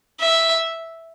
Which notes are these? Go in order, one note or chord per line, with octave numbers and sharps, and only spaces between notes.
E5